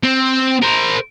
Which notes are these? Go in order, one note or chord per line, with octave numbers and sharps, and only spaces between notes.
C4
A#4 C5